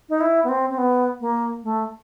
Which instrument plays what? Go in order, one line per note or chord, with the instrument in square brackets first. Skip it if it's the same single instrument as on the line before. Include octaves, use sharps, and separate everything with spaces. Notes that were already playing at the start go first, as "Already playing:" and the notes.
[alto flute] D#4
E4
B3
C4
C4
B3
A#3
A3